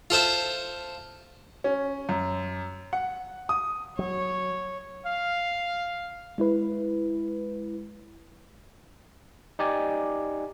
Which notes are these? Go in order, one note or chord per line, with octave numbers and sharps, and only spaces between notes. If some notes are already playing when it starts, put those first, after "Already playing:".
F4 A4 C5 E5
C#4
F#2
F#5
D#6
F#3 C#5
F5
G#3 E4 B4
D#4 G4 D5 G#5